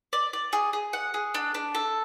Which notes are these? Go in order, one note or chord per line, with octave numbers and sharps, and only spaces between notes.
D5
D5
G#4
G#4
F#5
G#4
D4
D4
A4